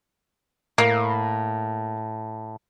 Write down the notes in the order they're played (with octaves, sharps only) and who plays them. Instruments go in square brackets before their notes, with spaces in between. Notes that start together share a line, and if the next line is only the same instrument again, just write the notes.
[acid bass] A2 [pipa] A#3